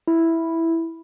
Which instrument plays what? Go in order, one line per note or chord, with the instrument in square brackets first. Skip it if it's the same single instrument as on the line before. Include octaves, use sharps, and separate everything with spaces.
[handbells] E4